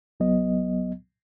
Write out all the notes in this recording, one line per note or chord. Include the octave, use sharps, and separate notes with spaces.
C2 F#3 B3 D#5